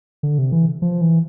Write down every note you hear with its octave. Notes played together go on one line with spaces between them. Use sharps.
D3
C3
E3
F3
E3